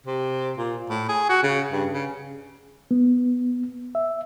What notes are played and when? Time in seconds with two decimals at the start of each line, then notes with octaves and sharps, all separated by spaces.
0.06 C3
0.57 A#2
0.90 A2
1.09 G#4
1.29 F#4
1.43 C#3
1.71 G2
1.93 C#3
2.91 B3
3.95 E5